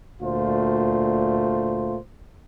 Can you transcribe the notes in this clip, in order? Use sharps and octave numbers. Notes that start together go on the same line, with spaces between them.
D2 A#2 A3 F4 C5